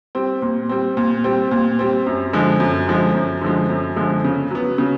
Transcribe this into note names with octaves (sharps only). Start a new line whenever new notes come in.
G3 C4
A#2
G3 C4
A#2
G3 C4
A#2
G3 C4
F#2
D3 F3 G#3
F#2
D3 F3 G#3
F#2
D3 F3 G#3
F#2
D3 F3 G#3
C#3
F#3 B3
C#3